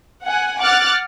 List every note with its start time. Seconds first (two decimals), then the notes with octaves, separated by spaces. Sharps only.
0.23 F#5 G#5
0.61 F#5 D6 F6 F#6 A6